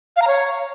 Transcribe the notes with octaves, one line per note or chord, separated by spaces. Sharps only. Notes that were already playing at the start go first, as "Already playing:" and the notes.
F5
A#5
C#5